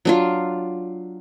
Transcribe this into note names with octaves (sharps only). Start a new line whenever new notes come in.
F#3 D4 F4